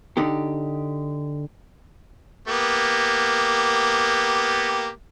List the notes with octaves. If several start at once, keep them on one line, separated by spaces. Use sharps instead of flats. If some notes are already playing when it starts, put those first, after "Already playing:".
D3 D#4 G4
A#3 B3 G4